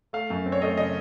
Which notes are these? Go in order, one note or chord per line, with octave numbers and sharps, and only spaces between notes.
A3 F5
F#2
C4
C#5
A3 D#5
C#3 D#5